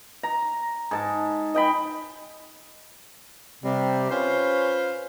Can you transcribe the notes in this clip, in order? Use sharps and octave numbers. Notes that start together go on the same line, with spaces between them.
A#5
G#2 A5
D#5 G5 B5
C3 G3
C#4 F4 B4 C5